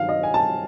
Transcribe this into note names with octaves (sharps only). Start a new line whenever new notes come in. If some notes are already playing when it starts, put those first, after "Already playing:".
Already playing: G2 D#3 F#3 F5
D#5
G#5
A5